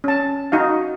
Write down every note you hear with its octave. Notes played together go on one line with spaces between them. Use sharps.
C#4 A5
D#4 F#4 F5